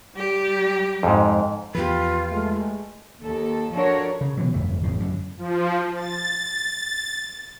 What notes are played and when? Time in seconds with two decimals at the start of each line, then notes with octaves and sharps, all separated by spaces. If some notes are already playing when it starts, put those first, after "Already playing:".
0.14 G3 G4
1.03 F2 G#2
1.75 E2 F3 F4 G4 B4
2.31 G#3 A3
3.21 D#2 A4
3.73 F3 D4 F#4 A4 A#4 C#5
4.21 C#3
4.37 B2 D3 E3 F#3
4.54 G1 F2 A3
4.83 A1 F2 A2 C#3
5.00 F#2 A2 D3
5.38 F3
5.96 A6